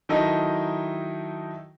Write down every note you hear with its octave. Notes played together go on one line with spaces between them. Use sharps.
D#3 F#3 D#4 E4 A4 D#5